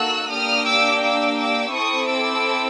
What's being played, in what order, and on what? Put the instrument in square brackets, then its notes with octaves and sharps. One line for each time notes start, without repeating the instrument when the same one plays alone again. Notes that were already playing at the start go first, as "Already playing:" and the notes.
Already playing: [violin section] A#3 D#4 F#4 A4 E6 F#6
A#3 D4 G4 D#6 F6
D6 E6
D6 E6
D6 E6
C4 E4 A4 C#6 D#6
D6 E6